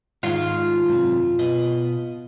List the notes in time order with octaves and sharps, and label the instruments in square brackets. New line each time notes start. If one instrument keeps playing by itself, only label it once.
[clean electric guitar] G#2 D#3 G#3 [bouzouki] F4
[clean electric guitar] F#2 C3
B2 B4 D#5